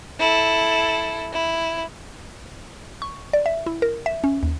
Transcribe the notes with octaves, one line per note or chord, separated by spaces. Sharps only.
E4 A4
E4
C#6
D5
E5
E4
A#4
E5
C#4
D#2